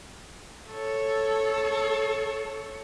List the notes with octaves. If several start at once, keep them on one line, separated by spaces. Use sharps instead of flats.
A4 C#5